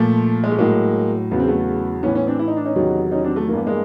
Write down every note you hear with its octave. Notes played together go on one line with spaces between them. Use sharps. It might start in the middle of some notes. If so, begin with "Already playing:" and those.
Already playing: A#2 F3 A3
G#3
A3
A2 F#3 G#3 A#3
E2 C#3 F#3 B3
C4
A3 B3
A2 E3 B3 C#4
B3 C#4
C4 D4
E4
D#4
D4
C#4 D#4
E2 C3 D#3 F#3
C#4 D#4
C4 D4
A3
G2 E3 A#3 B3
G#3 A#3